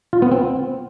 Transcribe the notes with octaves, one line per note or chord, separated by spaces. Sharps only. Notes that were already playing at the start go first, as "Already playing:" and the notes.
F4
B3
C4